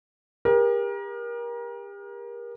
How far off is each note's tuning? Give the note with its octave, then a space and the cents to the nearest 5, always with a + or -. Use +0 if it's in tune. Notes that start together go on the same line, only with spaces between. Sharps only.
G4 +40 A#4 +30